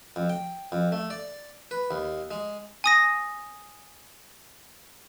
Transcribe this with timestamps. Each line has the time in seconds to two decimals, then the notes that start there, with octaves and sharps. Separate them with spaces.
0.16 F2
0.29 G5
0.72 F2
0.92 A3
1.10 D5
1.71 B4
1.91 D#2
2.31 G#3
2.84 G#5 D#6 A#6